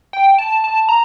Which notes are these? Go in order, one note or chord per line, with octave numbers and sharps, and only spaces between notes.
G5
A5
A5
A#5